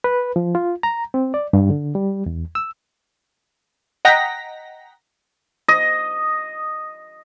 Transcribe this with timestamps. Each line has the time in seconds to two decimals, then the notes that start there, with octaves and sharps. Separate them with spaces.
0.04 B4
0.36 F3
0.55 F4
0.83 A#5
1.14 C4
1.34 D5
1.53 G2
1.70 D3
1.95 G3
2.26 E2
2.55 E6
4.05 D#5 F#5 G5 A#5 A#6 B6
5.68 D#5